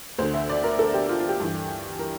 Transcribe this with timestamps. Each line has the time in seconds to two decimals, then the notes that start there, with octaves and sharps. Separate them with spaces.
0.19 D2 D3 C5
0.34 E5
0.50 D5
0.64 A#4
0.79 A4
0.94 G4
1.09 F4
1.20 F4
1.29 G4
1.40 G2 E3
1.99 A#4